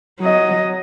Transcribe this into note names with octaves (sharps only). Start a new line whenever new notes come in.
F#3 D#5